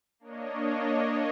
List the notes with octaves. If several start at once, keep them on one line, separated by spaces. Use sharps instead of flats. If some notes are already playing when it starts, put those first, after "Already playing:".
A#3 D4 C#5 D#5